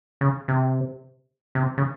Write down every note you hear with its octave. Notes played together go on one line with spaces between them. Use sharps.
C#3
C3
C3
C#3